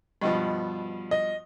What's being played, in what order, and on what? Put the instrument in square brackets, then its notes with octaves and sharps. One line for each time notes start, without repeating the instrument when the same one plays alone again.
[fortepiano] G2 B2 F3 [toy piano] G4 D#5 G5
[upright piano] D#5